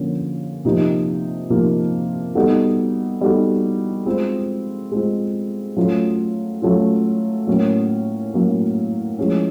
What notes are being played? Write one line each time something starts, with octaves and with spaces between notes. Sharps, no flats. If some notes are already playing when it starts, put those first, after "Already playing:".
Already playing: D3 F3 A#3 C#4 F4
C3 F3 A#3 D#4
C3 F3 A#3 D#4
G3 B3 D#4 F#4 A4
G3 B3 D#4 F#4 A4
G#3 C4 F4
G#3 C4 F4
F#3 A3 C#4 F4
F#3 A3 C#4 F4
A2 F#3 A#3 C#4
A2 F#3 A#3 C#4
F3 G#3 C#4 E4